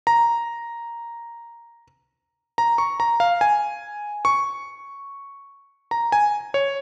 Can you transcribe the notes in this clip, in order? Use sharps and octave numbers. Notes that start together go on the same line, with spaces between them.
A#5
A#5
C#6
A#5
F5
G#5
C#6
A#5
G#5
C#5